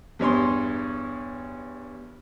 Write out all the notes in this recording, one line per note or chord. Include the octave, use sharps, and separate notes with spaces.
E2 G2 C#5 C6